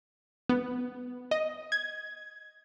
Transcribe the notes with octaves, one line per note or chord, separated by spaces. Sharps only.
B3
D#5
G#6